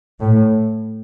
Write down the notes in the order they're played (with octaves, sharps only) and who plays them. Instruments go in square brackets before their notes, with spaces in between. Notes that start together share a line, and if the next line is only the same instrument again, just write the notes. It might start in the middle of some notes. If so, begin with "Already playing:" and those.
[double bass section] A2